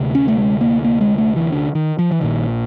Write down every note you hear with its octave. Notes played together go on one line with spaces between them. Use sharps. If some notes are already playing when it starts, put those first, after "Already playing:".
Already playing: D2 C3
C#4
A3
G#3
A#3
A#3
G#3
A3
E3
D3
D#3
F3
E3
A#1 A#2 D#3